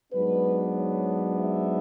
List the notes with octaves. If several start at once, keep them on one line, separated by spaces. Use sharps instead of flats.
G#2 F#3 B3 D4 B4
C#5
E5